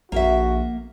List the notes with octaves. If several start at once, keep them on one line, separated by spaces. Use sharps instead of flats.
A#1 A#3 F#4 A#4 E5